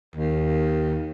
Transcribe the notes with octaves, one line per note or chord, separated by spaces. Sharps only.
D#2